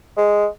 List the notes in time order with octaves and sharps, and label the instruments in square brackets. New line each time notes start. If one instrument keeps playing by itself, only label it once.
[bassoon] G#3